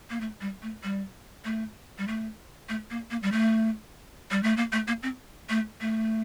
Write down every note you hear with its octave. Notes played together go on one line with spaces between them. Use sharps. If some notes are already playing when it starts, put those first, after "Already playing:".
A#3
A3
G3
A3
G3
A3
G3
A3
A3
A#3
A#3
G3
A3
G3
A3
A#3
A3
A#3
C4
A3
A3